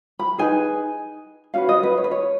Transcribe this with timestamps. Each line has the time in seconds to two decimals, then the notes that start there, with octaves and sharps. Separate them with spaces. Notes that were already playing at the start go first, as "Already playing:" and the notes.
0.19 B5
0.38 D#4 G#4 B4 G#5
1.54 C#4 F#4 B4 F5
1.69 D#5
1.83 B4
1.97 C#5
2.04 B4
2.11 C#5